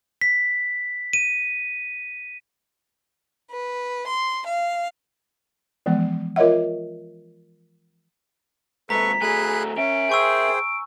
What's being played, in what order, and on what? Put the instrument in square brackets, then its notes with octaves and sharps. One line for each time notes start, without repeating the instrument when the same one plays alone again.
[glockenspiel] B6
D#7
[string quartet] B4
C6
F5
[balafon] E3 F3 G#3 B3
F4 A#4 C#5 D#5 E5 F#5
[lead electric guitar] G#2 C3 [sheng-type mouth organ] A4 B4 C#6 [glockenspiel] A#5 [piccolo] B6
[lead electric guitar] F#3 A3 [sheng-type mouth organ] G#4 B5 F#6 [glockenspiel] G#5
[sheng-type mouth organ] C#4 [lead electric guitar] A#4 E5 [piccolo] D7
[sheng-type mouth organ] G#4 C5 G5 [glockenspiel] G#5 C#6 E6